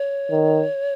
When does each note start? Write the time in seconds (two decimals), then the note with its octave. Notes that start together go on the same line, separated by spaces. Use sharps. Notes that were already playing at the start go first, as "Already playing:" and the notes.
Already playing: C#5
0.30 D#3